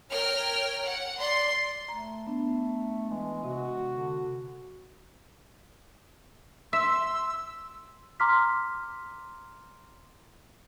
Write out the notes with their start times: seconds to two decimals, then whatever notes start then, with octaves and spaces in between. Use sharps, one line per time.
0.11 A#4 C#5 G5 F6
0.84 F#5
1.20 D5 C6
1.88 A3 A#5
2.27 B3 D4
3.10 E3 G#3
3.44 C3 F#4
3.93 D3
6.73 E5 C6 E6
8.20 A#5 C6 D6 F6 B6